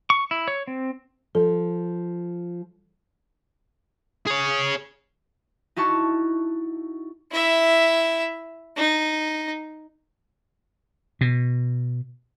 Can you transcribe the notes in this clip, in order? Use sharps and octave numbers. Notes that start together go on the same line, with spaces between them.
C#6
E4
C#5
C4
F3 A4
G#4 C#5
D#4 E4 F#4 A5 C#6
E4 E5
D#4
B2